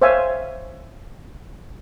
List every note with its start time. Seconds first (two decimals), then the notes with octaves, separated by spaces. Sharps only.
0.02 C5 C#5 E5 F5 G#5